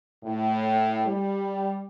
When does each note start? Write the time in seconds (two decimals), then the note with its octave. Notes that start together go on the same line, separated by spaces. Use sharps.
0.24 A2
1.06 G3